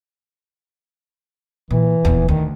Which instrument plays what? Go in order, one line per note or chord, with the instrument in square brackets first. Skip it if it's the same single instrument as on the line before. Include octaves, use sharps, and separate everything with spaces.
[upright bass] A#2 [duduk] E3
[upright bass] D#1 E2
[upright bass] D2 [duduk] D#3